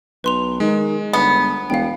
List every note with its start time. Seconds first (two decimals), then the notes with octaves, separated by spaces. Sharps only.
0.24 B1 B4 C6 F7
0.60 D#3 G#3
1.13 G1 B3
1.70 E1 F5 G5